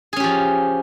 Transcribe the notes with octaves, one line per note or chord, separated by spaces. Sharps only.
F3 C#4 G4 G#4